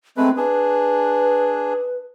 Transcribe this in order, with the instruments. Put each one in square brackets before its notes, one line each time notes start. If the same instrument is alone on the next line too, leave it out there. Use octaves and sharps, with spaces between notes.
[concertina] G#3 A3 B4 [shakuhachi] C4
[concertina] D4 G#4 [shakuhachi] B4